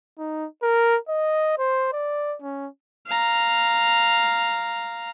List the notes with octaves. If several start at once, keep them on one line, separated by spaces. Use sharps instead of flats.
D#4
A#4
D#5
C5
D5
C#4
F5 A#5